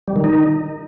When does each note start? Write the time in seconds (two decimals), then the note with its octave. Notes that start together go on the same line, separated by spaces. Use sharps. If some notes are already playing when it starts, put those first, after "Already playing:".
0.08 G3
0.16 D#3
0.24 D#4